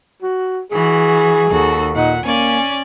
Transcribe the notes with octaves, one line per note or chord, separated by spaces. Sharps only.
F#4
E3 F#4 G#4
D#2 F#4 A4
A#2 D#4 F#5
A#3 C#4 D5 G#5